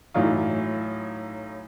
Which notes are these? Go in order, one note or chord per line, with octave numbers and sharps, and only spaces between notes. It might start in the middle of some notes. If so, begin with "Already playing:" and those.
A2 E3 F#3 D#4 F4